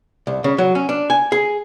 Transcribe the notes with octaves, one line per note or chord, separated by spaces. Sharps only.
C2
C#3
F#3
C#4
D4
G#5
G#4